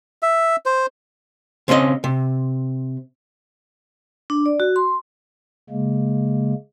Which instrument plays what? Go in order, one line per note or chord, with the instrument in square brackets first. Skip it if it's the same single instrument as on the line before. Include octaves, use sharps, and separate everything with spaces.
[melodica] E5
C5
[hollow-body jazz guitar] C#3 C4 C#4 E4 D#5
C3
[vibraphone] D4
D5
F#4
C6
[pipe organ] C#3 G#3 A#3